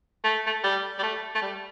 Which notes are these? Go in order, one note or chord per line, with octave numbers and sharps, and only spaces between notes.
A3
A3
G3
G3
A3
A3
G3